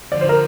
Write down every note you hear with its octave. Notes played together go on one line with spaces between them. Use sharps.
D3 F3 D5
C5
A#4